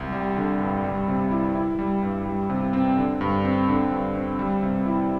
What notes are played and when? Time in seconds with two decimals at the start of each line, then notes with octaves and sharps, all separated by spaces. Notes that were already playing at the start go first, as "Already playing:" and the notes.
Already playing: C2
0.12 G3
0.37 D3
0.60 G2
0.84 G3
1.08 C3
1.31 E4
1.55 E4
1.79 G3
2.03 G2
2.26 G3
2.50 C3
2.73 C4
2.97 D3
3.21 G2
3.44 C4
3.69 D3
3.92 G2
4.15 C4
4.39 G3
4.63 C3
4.86 E4